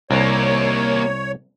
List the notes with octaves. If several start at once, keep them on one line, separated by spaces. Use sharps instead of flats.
C2 A#3 G4 C#5